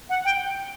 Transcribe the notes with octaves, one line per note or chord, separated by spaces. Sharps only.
F#5
G5